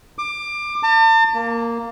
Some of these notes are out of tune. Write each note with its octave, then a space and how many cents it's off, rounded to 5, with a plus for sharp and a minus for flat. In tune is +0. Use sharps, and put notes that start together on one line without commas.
D6 +25
A5 +40
A#3 -5